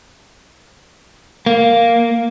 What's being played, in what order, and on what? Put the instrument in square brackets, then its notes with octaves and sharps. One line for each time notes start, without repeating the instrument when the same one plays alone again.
[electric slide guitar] A#3